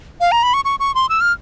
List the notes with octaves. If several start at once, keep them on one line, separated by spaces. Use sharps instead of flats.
F5
A#5
B5
C#6
C#6
C#6
C6
E6
F6